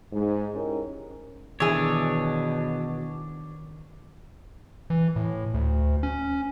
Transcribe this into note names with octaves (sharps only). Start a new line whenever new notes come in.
G#2
C#4 D#4 E4 G4 A#4
B2 D#3 E3 D4 G#4 C#5
E3
A2
D2
C#4